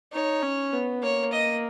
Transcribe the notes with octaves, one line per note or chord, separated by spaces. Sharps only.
D#4 C#5
C#4
B3
A#3 C#5
D#5